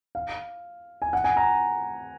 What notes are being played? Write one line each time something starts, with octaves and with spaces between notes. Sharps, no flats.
F5
G#5
F#5
G#5
A#5